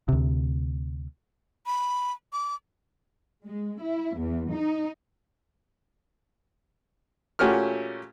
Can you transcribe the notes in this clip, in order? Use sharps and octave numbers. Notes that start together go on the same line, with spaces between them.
D2 C3
B5
D6
G#3
E4
E2
D#4
A#2 A3 C#4 F#4 G4 F6